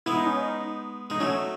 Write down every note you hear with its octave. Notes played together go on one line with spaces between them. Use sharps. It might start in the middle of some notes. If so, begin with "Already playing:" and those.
G#3 B3 E4
D#4
C#4
D#4
G#3 D#4
F#3 A3 C#4